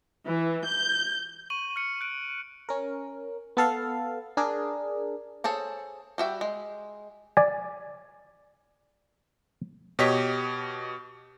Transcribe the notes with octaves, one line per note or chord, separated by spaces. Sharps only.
E3
G6
C#6 D#7 F#7
F6 C#7
F#6 D7
C#4 A#4
B3 A4 F5
D4 G#4 A#4
G#4 A4 C5 C#5
G3 F#4 E5 G5
G#3
D5 G#5
B2 G4 C#5 D#5 B6